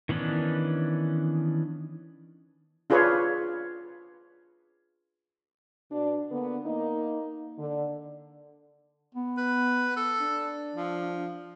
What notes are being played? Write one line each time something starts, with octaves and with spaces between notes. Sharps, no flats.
D#3 E3 B3 C#4 D4
D4 F4 G#4 B4 C#5
B2 D4
D3 A#3 B3
A#3 D#4
D3
B3
B4
A4
D4
F3